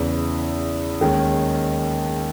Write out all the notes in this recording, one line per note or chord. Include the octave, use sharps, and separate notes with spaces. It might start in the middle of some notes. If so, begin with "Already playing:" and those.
Already playing: E2 C#3 E3
D#2 D#3 G#3 C#4